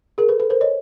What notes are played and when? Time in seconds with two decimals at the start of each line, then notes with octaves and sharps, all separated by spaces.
0.18 G#4 A#4
0.29 A4 B4
0.40 A4 B4
0.50 A#4 C5
0.61 C#5 D#5